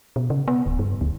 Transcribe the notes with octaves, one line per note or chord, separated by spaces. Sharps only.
B2
C#3
B3
D1
G2
D2